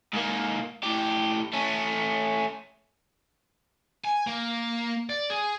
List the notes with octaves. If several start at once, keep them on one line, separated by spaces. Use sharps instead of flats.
G#2 A#3
A2 G4
A3 C#4
G#5
A#3
D5
G#4